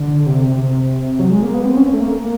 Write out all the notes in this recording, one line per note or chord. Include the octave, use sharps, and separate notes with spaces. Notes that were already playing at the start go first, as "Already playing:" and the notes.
Already playing: D3
C3
C3
F#3
G#3
A#3
B3
C4
C#4
A3
A#3